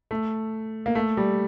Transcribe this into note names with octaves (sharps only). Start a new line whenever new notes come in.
A3
A#3
A3
G3